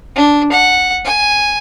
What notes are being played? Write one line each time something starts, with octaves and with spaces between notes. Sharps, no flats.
D4
F#5
G#5